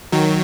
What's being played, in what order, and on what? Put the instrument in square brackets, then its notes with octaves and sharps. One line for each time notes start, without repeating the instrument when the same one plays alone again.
[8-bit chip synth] D#3 F#3